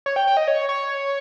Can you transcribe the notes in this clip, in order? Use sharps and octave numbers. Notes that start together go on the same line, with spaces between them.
C#5
G5
G5
D#5
C#5
C#5